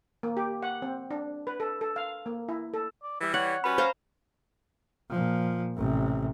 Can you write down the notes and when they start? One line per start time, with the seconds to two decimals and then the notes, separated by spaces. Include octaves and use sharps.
0.23 A#3
0.37 G4
0.63 F#5
0.82 C4
1.11 D4
1.47 B4
1.60 A4
1.81 A4
1.96 F5
2.26 A#3
2.49 E4
2.74 A4
3.03 D5
3.21 E3 G3 E5
3.34 C#5 F#5
3.64 G3 C#4 F#4 B4 B5
3.78 C5 F5 A#5
5.10 A#2 F3
5.77 A1 C3